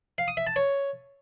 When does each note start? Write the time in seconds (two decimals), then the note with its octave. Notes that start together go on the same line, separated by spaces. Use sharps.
0.18 F5
0.28 D#6
0.37 E5
0.47 A5
0.56 C#5